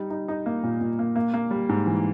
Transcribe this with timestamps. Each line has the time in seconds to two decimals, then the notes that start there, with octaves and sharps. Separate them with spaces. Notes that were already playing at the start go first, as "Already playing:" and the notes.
Already playing: G3 D#4
0.10 D#4
0.28 D#4
0.46 A#3
0.63 A#2
0.81 A#2
0.99 A#3
1.16 A#3
1.34 A#3
1.51 G3
1.69 G#2
1.87 E3